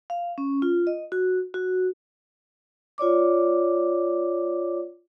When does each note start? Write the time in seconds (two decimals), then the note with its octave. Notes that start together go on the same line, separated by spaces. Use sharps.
0.10 F5
0.38 C#4
0.62 F4
0.87 D#5
1.12 F#4
1.54 F#4
2.98 F4 C#5 D5 D6